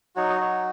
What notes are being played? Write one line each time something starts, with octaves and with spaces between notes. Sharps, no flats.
F#3 D#4 F#4 C#5
D#5
C#5